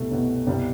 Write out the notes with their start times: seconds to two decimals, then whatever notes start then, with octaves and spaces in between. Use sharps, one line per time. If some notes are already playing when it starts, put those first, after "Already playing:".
Already playing: C2 B2 A3
0.11 C2 B2
0.47 C2 B2 G3